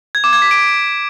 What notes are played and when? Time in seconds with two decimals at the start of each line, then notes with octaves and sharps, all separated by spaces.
0.15 G#6
0.24 D6
0.33 G#6
0.42 B6
0.51 D7